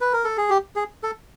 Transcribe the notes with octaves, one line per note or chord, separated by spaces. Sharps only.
B4
A#4
A4
G#4
G4
G#4
A4